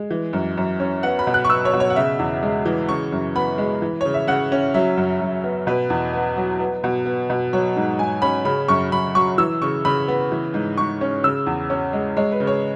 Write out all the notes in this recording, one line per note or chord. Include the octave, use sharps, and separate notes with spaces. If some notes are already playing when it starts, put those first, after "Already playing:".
Already playing: G#3
E3
F#2
F#2
C#4
B3 F#5
B5
B2
F#6
C#6
B3 E6
C#5
B2
C#5
F#5
C#3 E5
E2
G#3
E3
C#3 C#6
F#2
B3 B5
G#3
E3
C#3 C#5
E5
C#3 F#5
C#4
F#3 E5
F#2
F#2
B3
B2 B4
E2
B3
F#3
B3
B2
B3
B2
F#3 C#5
G#2
G#2 G#5
C#4 B5
C#3 B5
F#2 C#6
F#2 B5
F#3 C#6
E3 E6
C#3 C#6
C#3 B5
B3
E3
G#2
G#2 C#6
C#4
C#3 E6
E2
C#4
G#3
G#3 C#5
B4
C#3
C#5